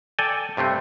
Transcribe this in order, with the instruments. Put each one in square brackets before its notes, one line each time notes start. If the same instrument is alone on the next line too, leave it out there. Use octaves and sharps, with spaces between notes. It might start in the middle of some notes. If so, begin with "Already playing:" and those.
[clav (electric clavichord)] A4 D5 G5 G#5
G2 C3 A3 C4